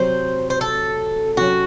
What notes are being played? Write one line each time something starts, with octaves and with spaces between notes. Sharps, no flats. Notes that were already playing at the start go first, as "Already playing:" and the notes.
Already playing: C3 F#3 C4 C5
C5
A4
C3 F#3 C#4 F#4